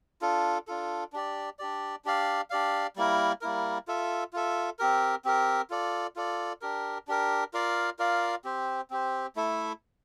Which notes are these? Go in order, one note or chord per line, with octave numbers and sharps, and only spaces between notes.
D4 F4 A4
D4 F4 A4
D4 G4 D5
D4 G4 D5
D4 G4 D5 F5
D4 G4 D5 F5
G3 A#3 E4 A#4
G3 A#3 E4 A#4
F4 A4 E5
F4 A4 E5
C4 G4 A#4
C4 G4 A#4
F4 A4 D5
F4 A4 D5
D4 G4 A#4
D4 G4 A#4
F4 A#4 D5 F5
F4 A#4 D5 F5
C4 G4 C5
C4 G4 C5
A3 E4 A4 E5